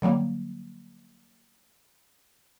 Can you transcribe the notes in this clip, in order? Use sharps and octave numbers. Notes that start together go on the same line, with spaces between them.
D3 F#3 G3 A#3